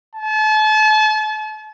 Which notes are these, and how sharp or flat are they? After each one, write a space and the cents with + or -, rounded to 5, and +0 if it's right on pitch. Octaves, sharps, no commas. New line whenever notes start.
A5 -40